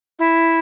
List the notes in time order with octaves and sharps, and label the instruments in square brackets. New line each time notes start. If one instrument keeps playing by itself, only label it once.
[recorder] E4